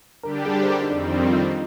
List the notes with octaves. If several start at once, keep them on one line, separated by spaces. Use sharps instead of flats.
D3 G3 D4 G4 A#4
G#4
C5
A#4
D#4
F2 D#3 G3 C4 D4
D4
F4
D#4